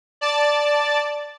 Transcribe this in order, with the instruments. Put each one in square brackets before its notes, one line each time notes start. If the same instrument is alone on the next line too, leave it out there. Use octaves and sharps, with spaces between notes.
[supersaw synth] D5 A5 A6